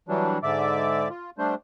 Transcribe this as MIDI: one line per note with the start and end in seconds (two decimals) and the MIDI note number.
0.09 0.38 52
0.09 0.38 54
0.09 0.38 55
0.09 0.38 62
0.43 1.08 44
0.43 1.08 50
0.43 1.08 74
0.43 1.08 76
0.43 1.08 86
1.10 1.30 65
1.38 1.55 55
1.38 1.55 57
1.38 1.55 62
1.38 1.55 72